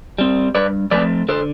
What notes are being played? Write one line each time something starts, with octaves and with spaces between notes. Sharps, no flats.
G3 C4
G2 B4 D5
F3 A3 C4 B4 D5
D3 A4 C5